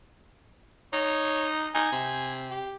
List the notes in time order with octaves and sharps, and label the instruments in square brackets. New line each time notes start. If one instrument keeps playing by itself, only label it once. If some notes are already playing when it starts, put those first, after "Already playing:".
[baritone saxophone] D#4 [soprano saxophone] C#5
[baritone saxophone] D#4 [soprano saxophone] G#5
[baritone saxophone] C3
[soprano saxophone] G4